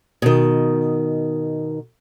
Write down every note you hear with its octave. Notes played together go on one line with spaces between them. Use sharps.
B2 D#3